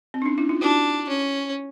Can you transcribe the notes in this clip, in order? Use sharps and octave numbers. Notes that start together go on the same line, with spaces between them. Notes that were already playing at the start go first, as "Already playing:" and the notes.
C4
D4
C#4 D#4
D4 E4
D#4 F4
D4 E4 F#4
C#4